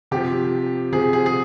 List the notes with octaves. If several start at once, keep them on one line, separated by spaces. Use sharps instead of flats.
C3 F3 G4
C3 F3 G#4
G#4
G#4